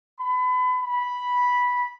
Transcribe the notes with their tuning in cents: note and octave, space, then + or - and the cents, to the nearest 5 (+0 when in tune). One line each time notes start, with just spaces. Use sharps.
B5 +30
B5 -5